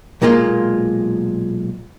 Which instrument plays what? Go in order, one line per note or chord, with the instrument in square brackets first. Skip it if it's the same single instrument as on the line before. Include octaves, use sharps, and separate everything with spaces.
[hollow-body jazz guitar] B1 A#2 G#3 A#3 F4